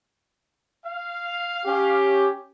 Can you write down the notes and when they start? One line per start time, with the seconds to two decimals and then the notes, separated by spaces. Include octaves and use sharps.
0.85 F5
1.65 C#4 G4